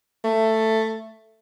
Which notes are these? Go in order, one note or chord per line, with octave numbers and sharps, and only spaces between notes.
A3